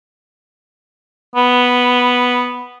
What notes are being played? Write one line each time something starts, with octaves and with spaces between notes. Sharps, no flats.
B3